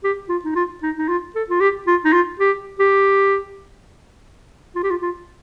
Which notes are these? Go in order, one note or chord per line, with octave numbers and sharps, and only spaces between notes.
G4
F4
D#4
F4
D#4
D#4
F4
A4
F4
G4
F4
D#4
F4
G4
G4
F4
G4
F4
F4